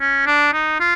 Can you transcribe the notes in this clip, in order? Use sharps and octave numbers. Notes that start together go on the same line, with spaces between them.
C#4
D4
D#4
F4